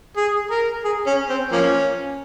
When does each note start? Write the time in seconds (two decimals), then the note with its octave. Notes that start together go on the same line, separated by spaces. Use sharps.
0.17 G#4
0.51 A#4
0.84 G#4
1.07 C#4
1.29 C4
1.52 F3 A#3 C#4